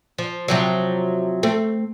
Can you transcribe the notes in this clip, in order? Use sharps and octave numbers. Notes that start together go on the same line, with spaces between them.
F3
C3 F3 F#3
A3 C4